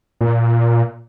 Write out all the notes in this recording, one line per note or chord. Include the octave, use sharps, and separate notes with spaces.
A#2